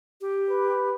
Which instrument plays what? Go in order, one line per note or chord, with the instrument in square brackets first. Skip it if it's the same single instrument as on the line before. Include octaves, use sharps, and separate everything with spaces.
[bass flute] G4
[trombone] B4